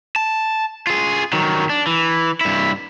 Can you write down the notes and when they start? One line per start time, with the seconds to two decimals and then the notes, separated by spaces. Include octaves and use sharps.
0.16 A5
0.87 F4 G#4
1.33 D#3 F#3
1.70 D4
1.87 E3
2.41 G2 E4